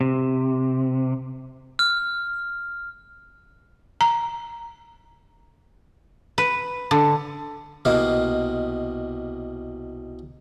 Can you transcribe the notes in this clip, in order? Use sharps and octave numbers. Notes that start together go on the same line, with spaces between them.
C3
F6
A#5
B4
D3
C2 B2 A#3 D#5 F5